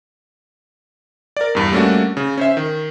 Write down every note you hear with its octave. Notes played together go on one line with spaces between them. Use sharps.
A#4 D5
E2 G2
G3 A3 A#3 C#4 D4 F#4
C#3
C#4 C5 E5
D#3